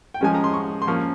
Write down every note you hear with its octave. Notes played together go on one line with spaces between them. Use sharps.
G5
F3 G#3 C#4 G#5
A#5
C6
C#6
C6
F3 A#3 C#4 C#6